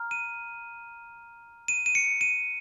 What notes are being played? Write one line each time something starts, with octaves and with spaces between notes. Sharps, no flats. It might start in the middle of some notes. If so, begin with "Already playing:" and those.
Already playing: A#5 F6
D#7
D#7
D#7
C#7
D#7